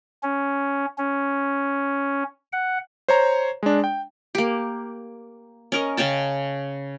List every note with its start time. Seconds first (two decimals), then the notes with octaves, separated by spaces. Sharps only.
0.23 C#4
0.98 C#4
2.53 F#5
3.09 C5 C#5 A#5
3.63 G#3 D4
3.84 G5
4.35 A#3 G4
5.72 C#4 A#4 D#5
5.97 C#3 C#4 G5 A5